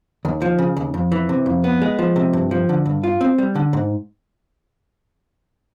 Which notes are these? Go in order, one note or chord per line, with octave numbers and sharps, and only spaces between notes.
D#2
F3
C#3
D#2
F2
E3
C3
F2
B3
G#3
F3
C3
G2
F3
D3
G2
F4
C4
G3
D3
G#2